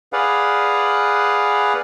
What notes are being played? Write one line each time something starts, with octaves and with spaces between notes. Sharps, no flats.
G#4 B4 D5 F5 F#5